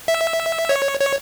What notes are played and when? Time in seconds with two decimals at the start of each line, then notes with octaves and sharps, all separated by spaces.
0.08 E5
0.69 C#5
1.00 C#5